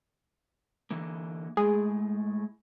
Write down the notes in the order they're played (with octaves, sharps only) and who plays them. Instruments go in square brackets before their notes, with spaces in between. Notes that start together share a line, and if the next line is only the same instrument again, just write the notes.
[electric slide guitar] D3 E3 A#3
[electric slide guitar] A2 G#3 [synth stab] G#4